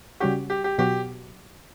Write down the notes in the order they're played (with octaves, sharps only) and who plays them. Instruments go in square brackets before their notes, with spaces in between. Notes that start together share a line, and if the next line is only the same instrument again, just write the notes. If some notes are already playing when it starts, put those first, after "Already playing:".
[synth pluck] C#3 G3 C#4 F#4 [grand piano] G4
[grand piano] G4
G4
[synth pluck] B2 F#3 B3 F#4 [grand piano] G4